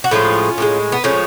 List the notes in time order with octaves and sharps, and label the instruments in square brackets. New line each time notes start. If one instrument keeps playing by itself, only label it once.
[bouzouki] F#4
A2 F3 G#3 C#4 F4
A2 F3 G#3
B3
A2 F3 G#3 C#4